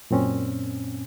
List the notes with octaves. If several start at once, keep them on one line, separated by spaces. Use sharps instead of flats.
F#2 A#2 C4 C#4